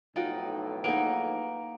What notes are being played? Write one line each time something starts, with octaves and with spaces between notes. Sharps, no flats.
B1 F2 A2 D#4 F4 F#4 G5
A#3 D#4 G#4 B4 F#5 D7